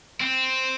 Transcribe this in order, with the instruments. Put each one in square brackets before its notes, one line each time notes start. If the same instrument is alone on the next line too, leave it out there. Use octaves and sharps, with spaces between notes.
[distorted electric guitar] C4